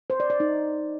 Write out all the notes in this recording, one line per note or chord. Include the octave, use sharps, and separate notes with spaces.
C5
D5
D5
D#4